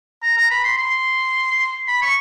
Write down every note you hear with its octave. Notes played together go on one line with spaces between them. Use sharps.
A#5
A#5
B5
C6
C6
B5
C#6